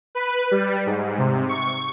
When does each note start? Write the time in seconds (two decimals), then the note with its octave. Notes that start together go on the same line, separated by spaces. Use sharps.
0.15 B4
0.51 G3
0.86 G#2
1.18 C3
1.49 C#6